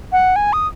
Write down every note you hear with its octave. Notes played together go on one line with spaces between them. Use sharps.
F#5
G#5
D#6